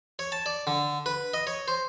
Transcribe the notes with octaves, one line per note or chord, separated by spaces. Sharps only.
C#5
A5
D5
D3
B4
D#5
C#5
C5